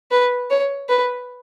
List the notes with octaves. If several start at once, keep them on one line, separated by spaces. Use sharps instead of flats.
B4
C#5
B4